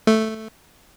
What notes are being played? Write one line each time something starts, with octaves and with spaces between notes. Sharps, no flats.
A3